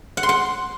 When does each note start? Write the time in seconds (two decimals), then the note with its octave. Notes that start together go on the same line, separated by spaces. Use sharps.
0.17 F#5
0.23 C6
0.29 F#5